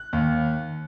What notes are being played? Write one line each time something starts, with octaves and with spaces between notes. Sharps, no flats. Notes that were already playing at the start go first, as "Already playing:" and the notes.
Already playing: F#6
D#2